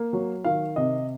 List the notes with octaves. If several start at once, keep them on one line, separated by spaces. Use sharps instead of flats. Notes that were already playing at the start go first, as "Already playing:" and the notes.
Already playing: A#3
F#3
D#3 F5
C3 D#5